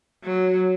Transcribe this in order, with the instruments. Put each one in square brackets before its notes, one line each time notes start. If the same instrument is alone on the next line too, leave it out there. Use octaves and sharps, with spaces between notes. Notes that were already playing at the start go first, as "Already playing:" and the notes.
[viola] F#3